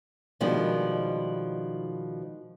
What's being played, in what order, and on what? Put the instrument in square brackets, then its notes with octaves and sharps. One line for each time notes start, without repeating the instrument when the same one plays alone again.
[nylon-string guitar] B2 D#3 F3 G3 G#3 D4